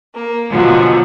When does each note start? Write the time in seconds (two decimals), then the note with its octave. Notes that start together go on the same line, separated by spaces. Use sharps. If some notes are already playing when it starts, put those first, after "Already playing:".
0.15 A#3
0.50 B2 D3 F3 F#3 G#3